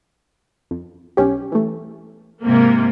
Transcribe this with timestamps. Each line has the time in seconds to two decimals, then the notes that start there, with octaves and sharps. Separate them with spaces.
0.71 F2
1.17 B1 C#4 G4
1.52 E3 A3
2.44 G#2 C3 A#3